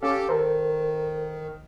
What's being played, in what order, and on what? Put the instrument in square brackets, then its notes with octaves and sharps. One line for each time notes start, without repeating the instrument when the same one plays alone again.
[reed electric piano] C#4 F5 [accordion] G4 A4
[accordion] D#3 [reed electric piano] A4 A#4 C5